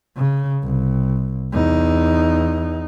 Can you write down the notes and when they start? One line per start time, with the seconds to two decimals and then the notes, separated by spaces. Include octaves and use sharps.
0.16 C#3
0.63 C2
1.52 E2 D#4